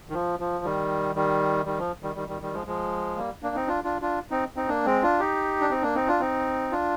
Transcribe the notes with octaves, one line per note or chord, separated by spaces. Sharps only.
D#3
F3
F3
D#3 G3
D#3 G3
D#3 G3
F3
D#3 G3
D#3 G3
D#3 G3
D#3 G3
F3 G#3
F3 G#3
G3 A#3
A#3 D4
C4 D#4
D4 F4
D4 F4
D4 F4
C4 D#4
C4 D#4
A#3 D4
G#3 C4
D4 F4
D#4 G4
D4
C4 D#4
A#3 D4
C4 D#4
D4 F4
C4 D#4
D4 F4